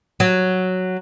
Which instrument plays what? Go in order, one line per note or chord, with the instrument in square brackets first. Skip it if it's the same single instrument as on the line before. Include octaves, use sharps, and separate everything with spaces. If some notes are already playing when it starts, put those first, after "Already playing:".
[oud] F#3